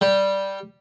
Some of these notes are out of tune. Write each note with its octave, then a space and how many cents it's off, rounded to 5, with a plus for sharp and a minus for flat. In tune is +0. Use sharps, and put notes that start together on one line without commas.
G3 -5